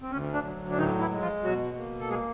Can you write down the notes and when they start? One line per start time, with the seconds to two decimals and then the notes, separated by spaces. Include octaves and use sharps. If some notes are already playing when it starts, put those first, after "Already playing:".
0.02 C4
0.11 D2 C#4
0.33 D3 D4
0.44 F#3
0.70 D4
0.77 A2 D#3 D#4
1.00 E3 E4
1.11 G#3
1.21 F3 F4
1.44 B2 F#3 F#4
1.77 A#3
2.00 A4
2.10 G#3 G#4